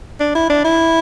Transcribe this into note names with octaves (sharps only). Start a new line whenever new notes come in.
D4
E4
D4
E4